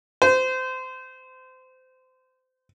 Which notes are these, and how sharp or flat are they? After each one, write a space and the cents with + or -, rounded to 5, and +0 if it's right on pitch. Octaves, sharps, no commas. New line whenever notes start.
C5 -25